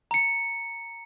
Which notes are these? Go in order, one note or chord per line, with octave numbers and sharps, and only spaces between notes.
A#5 C#7